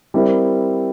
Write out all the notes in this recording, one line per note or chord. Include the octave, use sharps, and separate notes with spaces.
G3 C4 E4 A#4